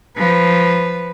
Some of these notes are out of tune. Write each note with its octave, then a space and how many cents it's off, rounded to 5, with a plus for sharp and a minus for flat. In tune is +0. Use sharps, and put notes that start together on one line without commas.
F3 +0 B4 +0